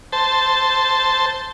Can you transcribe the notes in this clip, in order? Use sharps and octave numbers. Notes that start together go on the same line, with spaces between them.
C5 A5